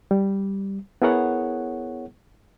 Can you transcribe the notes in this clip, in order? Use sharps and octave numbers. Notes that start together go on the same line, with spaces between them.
G3
B3 E4 G#4 A#4 C#5 F#5